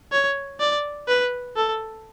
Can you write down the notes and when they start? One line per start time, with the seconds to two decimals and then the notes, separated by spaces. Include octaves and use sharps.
0.12 C#5
0.60 D5
1.08 B4
1.56 A4